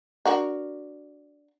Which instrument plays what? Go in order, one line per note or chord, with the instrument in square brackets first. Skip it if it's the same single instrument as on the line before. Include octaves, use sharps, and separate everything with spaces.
[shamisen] D4 F#4 A#4